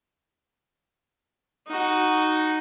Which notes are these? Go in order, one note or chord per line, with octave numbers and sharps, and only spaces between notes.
D#4 F#4